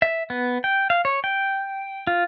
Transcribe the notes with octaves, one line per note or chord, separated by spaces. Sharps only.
E5
B3
G5
F5
C#5
G5
F4